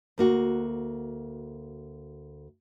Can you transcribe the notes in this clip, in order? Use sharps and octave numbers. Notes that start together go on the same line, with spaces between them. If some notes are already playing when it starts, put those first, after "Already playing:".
D2 A#3 F#4